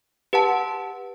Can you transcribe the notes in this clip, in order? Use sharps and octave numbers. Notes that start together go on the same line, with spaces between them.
G4 B4 F#5 A5